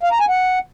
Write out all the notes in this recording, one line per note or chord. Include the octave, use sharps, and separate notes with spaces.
F5
A#5
G#5
F#5